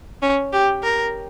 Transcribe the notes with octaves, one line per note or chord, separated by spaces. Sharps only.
C#4
G4
A#4